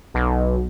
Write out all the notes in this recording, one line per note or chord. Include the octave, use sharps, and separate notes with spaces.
B1